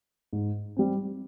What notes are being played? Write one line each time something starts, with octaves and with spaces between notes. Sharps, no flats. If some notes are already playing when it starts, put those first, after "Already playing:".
G#2
G3 C4